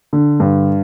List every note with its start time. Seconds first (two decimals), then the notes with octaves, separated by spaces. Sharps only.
0.13 D3
0.40 G2